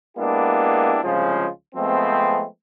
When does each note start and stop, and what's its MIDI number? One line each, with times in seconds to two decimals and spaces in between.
0.18 0.98 56
0.18 0.98 58
0.18 0.98 59
0.18 0.98 62
0.18 0.98 64
0.18 0.98 67
1.03 1.46 36
1.03 1.46 49
1.03 1.46 53
1.03 1.46 56
1.03 1.46 65
1.75 2.43 53
1.75 2.43 56
1.75 2.43 57
1.75 2.43 59
1.75 2.43 60